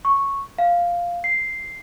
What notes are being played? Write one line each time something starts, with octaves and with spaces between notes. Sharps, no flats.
C#6
F5
C7